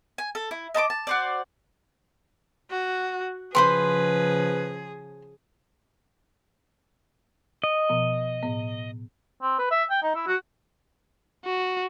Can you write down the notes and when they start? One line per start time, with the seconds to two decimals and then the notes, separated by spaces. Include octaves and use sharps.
0.18 G#5
0.35 A4
0.51 E4
0.74 D#5 A5 B5 D6
0.90 A5
1.07 F#4 C5 D5
2.70 F#4
3.55 C#3 F3 G#4 B4 C5 B5 C6
7.64 D#5
7.89 B2 F3 B3
8.43 A2 B3
9.42 C4
9.59 B4
9.71 E5
9.90 G5
10.03 D#4
10.15 E4
10.27 F#4
11.45 F#4